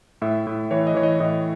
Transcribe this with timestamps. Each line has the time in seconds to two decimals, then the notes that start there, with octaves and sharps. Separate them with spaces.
0.22 A2 E5
0.47 A2
0.71 E3 C#5
0.87 D#5
0.95 E3 C#5
1.03 D#5
1.20 A2 D#5